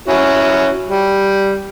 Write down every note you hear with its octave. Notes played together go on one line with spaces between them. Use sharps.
C#4 E4 F#4
G3